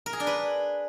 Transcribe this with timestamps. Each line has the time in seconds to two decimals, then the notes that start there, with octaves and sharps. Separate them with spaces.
0.06 A#4
0.13 G#4
0.20 D4
0.27 B4